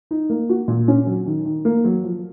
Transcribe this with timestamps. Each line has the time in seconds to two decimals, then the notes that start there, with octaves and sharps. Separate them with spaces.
0.11 D#4
0.30 A#3
0.49 F#4
0.68 A#2
0.88 C#4
1.07 F#3
1.26 D#3
1.45 D#3
1.65 A#3
1.84 F#3
2.04 F3